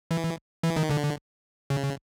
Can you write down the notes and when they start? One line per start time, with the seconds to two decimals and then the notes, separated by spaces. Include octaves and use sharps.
0.11 E3
0.63 E3
0.76 D#3
0.91 D3
1.70 C#3